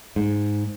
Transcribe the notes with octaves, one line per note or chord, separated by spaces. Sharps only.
G#2